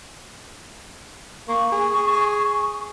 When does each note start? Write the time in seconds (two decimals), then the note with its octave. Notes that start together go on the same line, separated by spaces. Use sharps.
1.48 A#3 C#6
1.72 G#4